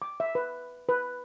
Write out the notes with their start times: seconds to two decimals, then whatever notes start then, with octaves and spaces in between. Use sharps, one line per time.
0.02 D6
0.20 E5
0.35 B4
0.89 B4